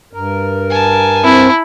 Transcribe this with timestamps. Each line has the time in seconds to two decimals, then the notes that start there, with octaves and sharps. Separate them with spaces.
0.13 G2 A#4
0.70 G#5 A5
1.24 C4 E4